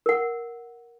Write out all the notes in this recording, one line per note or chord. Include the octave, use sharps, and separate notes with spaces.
A#4 F#5